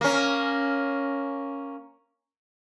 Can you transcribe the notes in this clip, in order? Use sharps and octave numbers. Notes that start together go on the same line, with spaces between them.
A#3 C#4